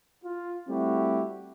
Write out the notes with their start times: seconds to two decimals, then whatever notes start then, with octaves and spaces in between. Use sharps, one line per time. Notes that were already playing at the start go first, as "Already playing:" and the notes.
0.24 F4
0.68 G3 A3 C4 E4 F#4 G4